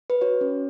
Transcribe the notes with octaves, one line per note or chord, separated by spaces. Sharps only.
B4
F#4 C#5
C#4